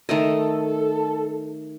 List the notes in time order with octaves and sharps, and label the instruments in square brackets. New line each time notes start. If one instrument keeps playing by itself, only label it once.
[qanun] D#3 A3 D#5 [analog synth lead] A4